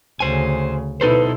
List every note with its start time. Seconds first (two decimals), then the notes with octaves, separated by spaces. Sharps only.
0.20 D2 C#3 C5 G#5
1.01 B2 D#4 E4 A4 B4 C5